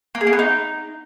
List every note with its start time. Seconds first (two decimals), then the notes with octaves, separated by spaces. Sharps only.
0.15 A#3
0.21 G#4
0.27 A#3
0.33 B3
0.39 D#4